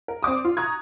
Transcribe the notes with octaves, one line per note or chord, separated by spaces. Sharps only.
A#4
C4 D5 D6 D#6
F4
A#5 C#6 D#6 F#6 G#6